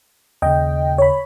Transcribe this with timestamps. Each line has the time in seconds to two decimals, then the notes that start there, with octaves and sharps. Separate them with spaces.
0.42 D#2 C#3 D#5 G5
0.98 C#5 B5